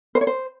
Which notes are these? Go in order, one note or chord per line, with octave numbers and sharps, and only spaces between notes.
C5
C#5
C5